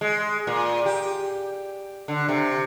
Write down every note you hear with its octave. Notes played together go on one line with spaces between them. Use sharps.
G#3
A#2
G4
D3
C3